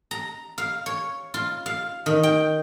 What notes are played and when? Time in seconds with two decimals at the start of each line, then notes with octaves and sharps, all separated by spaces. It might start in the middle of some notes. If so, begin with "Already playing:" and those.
0.11 A#5
0.58 F5
0.86 C#5
1.34 F4
1.66 F5
2.06 D#3
2.23 G5